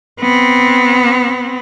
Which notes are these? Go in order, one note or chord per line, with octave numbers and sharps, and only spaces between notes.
B3 C4